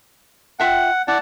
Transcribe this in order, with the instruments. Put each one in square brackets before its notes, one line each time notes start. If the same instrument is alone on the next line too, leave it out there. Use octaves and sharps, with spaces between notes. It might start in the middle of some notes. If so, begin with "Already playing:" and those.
[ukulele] F4 E5 G5 [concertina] F#5
[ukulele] E4 [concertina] D5 F#5 A5